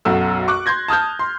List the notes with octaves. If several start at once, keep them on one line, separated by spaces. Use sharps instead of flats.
B1 F#2 F#4 A4 E6
C#6 D6 F#6
C6 G6 G#6 A#6
A5 D#6 F6 G6
C6